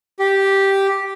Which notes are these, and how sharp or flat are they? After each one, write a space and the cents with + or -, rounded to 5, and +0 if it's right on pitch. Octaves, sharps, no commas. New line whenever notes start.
G4 -5